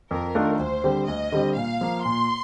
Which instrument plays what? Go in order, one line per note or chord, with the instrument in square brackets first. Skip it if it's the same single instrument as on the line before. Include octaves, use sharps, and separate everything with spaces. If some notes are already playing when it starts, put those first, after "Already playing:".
[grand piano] F2 [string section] A#4
[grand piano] D#3 A3 D4 F4
[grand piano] D2 [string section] C5
[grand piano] D3 G3 C4 G4
[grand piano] D2 [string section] D#5
[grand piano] D3 G3 C4 G4
[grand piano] A#2 [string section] F5
[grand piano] F3 A#3
[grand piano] A#2 [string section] C6